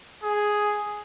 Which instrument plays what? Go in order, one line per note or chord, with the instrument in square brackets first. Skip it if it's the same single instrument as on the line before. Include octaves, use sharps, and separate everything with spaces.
[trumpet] G#4